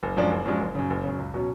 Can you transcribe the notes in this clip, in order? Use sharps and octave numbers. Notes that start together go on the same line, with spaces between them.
F#1
F#2 F3 G#3 D4
F#1
F#2 F3 G#3 D4
F#1
F#2 C#3
F#1
F#2 C#3
C#2
B2 F#3 C#4